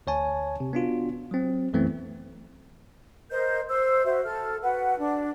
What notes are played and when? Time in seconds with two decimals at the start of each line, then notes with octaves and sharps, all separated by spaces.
0.07 D2 C#5 G#5 A5
0.60 C3
0.73 B3 D4 F4 F#4
1.31 F#3 C4
1.73 B1 F#2 E3 A3 B3 C4
3.30 A#4 C5 D#5 G6
3.69 C5 E6
4.05 F#4 C5 E5
4.24 A4 F6
4.62 F#4 B4 F#5
4.98 D4